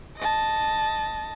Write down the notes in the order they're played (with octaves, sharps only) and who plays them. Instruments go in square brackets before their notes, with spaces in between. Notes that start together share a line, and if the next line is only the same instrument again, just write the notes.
[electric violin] D#5 A5